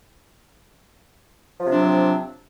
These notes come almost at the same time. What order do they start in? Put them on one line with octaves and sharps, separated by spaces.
F3 C3 D4 F#3 C4